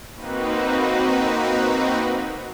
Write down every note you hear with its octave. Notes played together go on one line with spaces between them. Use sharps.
A#3 C4 D#4 F#4 B4